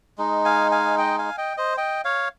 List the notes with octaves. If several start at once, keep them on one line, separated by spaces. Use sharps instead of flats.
G#3 D#4
F5 G#5
F5 G#5
D#5 G5
F5 G#5
D#5 G5
C5 D#5
D#5 G5
C#5 F5